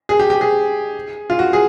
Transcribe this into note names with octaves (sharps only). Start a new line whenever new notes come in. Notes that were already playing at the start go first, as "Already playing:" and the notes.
G#4
G4
G4
G#4
F4
F#4
G#4